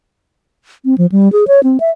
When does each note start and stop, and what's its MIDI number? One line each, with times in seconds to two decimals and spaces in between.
0.85 0.97 60
0.98 1.06 53
1.12 1.31 55
1.32 1.44 68
1.48 1.60 73
1.63 1.78 60
1.80 1.90 76